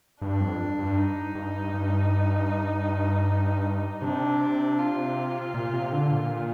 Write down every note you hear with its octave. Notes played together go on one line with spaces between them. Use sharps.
G2 D4
F2
G2
D#4
G2
G2
C3 D4
F4
A#2
C3
D3
A#2